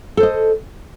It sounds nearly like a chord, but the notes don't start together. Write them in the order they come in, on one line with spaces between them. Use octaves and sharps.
A4 C5 D#5